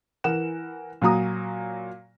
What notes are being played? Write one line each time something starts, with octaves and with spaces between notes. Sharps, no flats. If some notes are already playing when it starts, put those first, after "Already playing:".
E3 A#4 F#5 E7
A#2 F#3 F#4 A#5 D#6